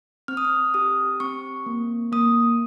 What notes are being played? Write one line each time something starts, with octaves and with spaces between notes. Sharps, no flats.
C4 F6
D#6
F6
G4 D#6
C4 C#6
A#3
A#3 D#6